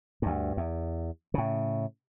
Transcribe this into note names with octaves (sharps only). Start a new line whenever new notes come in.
D2 G2
E2
A2 C#3